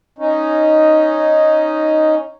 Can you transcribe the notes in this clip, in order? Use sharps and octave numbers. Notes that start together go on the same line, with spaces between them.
C#4 D#4